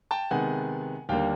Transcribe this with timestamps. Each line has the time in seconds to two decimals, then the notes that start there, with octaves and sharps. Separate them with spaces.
0.11 G5 A5
0.31 C3 D#3 G#3 B3 F#5 G#5
1.09 D#2 D3 G3 A#3 F5 G5